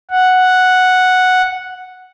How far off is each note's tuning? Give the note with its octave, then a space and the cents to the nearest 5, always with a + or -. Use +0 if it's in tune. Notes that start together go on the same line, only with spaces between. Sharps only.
F#5 -5